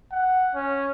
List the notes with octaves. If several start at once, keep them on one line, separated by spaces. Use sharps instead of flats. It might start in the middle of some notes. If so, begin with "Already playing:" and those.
F#5
C#4